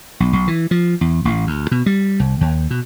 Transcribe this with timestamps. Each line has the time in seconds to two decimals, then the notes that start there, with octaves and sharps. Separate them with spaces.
0.20 B1
0.33 B1
0.48 E3
0.71 F3
1.01 E2
1.25 A1
1.47 D2
1.71 B2
1.86 G3
2.20 C2
2.41 D#2
2.70 B2